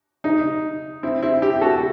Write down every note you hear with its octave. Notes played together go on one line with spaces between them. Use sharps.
D#4
C4 E4
C4 E4
E4 G4
F#4 A4